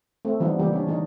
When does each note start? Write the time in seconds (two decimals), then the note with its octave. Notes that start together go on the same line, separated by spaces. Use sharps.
0.25 A3 C4
0.40 E3 F3 G3 B3 D#4
0.59 C#3 E3 F3 G3 A#3 G4
0.73 C#4 D4
0.87 D#3 E3 G#3 D#4